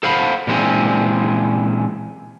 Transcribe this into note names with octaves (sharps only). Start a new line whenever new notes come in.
A4 C5 F5 F#5 B5
A#2 E3 G#3 C4 C#4